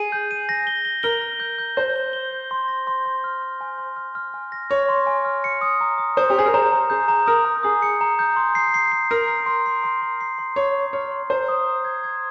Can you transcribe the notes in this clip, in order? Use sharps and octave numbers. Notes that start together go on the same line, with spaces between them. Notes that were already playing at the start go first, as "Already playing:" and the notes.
Already playing: G#4 D#7
G6
D#7
A#6
G7
G7
A#4 G7
A#6
G6
G6
C5 G6
G7
G7
G6
C6
A#6
C6
C6
F6
F6
G#5
C6
F6
F6
G#5
A#6
C#5 A#6
C6
G#5
F6
C#7
D#6
A#5
D#6
C5 D#6
G4
G#4 G6
A#4
C5 A#5
A#5
G#4 G6
A#5
A#4 D#6
A#5
G#4 D#6
C#7
A#5
G6
C6
C7
C7
C7
A#4 C7
C7
C6
C7
C6
C6
C7
C6
C#5 C6
C6
C#5 F6
C6
C5 A#5
D#6
A#5
G#6
G#6